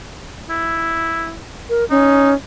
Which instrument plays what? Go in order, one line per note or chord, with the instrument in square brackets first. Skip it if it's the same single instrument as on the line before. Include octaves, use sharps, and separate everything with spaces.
[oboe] E4
[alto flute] A#4
[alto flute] C#4 [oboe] D#4